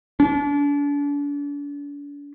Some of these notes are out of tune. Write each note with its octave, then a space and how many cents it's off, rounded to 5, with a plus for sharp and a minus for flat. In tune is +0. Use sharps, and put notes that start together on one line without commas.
D4 -40